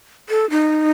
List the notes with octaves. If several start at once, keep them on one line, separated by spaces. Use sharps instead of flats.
A4
D#4